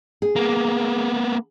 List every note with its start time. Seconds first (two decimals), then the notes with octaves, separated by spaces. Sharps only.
0.22 G#4
0.36 A#3 B3